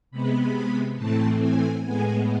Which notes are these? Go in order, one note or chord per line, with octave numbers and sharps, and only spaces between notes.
C3 G#3 B3 B5
A2 E3 A3 C4 A5
G#5
A2 G#3 B3 G#5